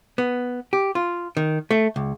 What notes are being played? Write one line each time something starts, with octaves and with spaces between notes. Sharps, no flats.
B3
G4
F4
D#3
A3
C#2